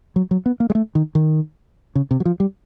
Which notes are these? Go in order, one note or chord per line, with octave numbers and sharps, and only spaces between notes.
F#3
F#3
B3
A#3
G#3
A3
D#3
D#3
C#3
C3
F#3
F3
G3